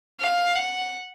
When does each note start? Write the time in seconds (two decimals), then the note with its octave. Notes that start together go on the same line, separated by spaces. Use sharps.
0.20 F5
0.55 F#5